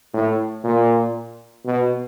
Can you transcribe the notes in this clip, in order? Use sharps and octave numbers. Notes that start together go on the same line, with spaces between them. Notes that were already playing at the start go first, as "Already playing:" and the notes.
A2
A#2
B2